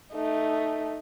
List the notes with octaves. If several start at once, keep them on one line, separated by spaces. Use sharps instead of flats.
A3 D#4